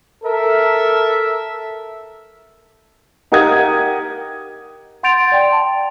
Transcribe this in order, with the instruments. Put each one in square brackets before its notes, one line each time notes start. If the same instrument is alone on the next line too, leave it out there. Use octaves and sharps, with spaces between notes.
[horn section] A4 A#4 E5
[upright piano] D#4 G4 A#4 F#5 D#6 G#6
[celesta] F#5 C6 G6 A6 D7 F7
D5 G5 C6
A5